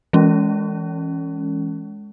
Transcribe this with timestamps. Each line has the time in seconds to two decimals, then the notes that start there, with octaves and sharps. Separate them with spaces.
0.13 E3 G#3 C#4